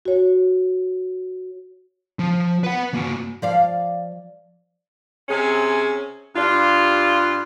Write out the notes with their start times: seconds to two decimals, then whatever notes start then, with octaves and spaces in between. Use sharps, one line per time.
0.05 F#4 C#5
2.19 F3
2.64 B4 F#5
2.94 A#3 F#4
3.42 F3 D5 F5
5.29 C3 C4 C#4 G#4
6.35 G2 G3 F4